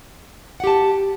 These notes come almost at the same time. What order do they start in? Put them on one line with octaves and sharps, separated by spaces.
F#5 G4 A5